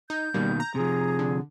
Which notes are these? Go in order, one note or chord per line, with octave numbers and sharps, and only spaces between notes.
D#4 G6
B2 D#3 G3 A#3
A#5
C3 F3 G#4
D3